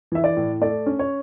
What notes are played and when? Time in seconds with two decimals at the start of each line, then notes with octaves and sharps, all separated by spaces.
0.12 E3 E5
0.24 D5
0.37 A2
0.61 A3 D5
0.86 C#4
0.99 C#5